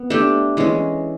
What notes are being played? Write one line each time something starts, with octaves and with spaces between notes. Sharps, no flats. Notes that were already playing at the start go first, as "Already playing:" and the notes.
Already playing: B3
A3 D4 G4
E3 G#3 C#4